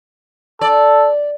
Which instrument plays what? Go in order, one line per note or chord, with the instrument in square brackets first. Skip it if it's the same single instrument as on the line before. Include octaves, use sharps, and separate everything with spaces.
[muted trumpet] A4 [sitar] D5